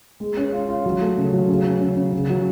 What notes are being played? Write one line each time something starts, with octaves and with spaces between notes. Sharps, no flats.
G#3
C#4
F4
F4
F#3
A3
C#3
F#3
C#3
C#4
C#3
C#3
C#3
F#3